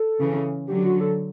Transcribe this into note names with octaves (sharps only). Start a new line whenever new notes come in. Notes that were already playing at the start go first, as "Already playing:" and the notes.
Already playing: A4
C#3 E3
D3 F#3 G4
F#4
A4